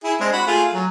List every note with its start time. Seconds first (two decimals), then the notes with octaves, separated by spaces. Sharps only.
0.04 E4 G#4
0.20 G#3 C4 D4
0.32 F#4 F#5 B5
0.47 A3 F4 G#4
0.74 F#3